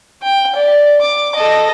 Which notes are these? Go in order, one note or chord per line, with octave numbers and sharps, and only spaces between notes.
G5
D5
D6
A4 D#5